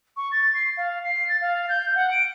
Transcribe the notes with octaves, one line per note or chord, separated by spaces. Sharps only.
C#6
A6
C7
F5
C7
A6
F5
G6
F#5
D7